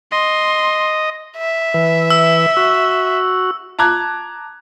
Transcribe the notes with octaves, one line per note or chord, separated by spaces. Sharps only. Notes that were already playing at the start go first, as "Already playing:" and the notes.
D#5 C6
E5
E3
E6
F#4
A5 A#5 D6 F#6 G#6